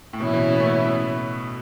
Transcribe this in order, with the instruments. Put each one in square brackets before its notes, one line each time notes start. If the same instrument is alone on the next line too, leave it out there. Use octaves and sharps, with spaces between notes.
[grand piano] A2
[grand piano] B2 [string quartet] E3 C#4 E4
[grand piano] B2
C#3
B3
A3